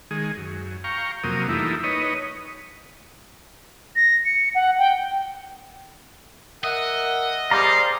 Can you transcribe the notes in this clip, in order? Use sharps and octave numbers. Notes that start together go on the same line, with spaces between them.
D#3 G#3 G#4
F#2
F5 G5 A#5 C#6
F2 C3 F#3 A#3 A#4 D#6
E3 G3 A3 A#3 D#4 E4
D#4 B4 C#5 D#5
A#6
C#7
F#5
G5
A#4 D#5 E5 F#5
G3 G#4 C5 D5 F5 A#5